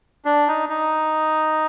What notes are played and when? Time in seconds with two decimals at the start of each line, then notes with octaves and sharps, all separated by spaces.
0.25 D4
0.48 D#4
0.69 D#4